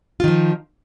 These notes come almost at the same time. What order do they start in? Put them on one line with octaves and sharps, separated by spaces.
F4 D#3 F3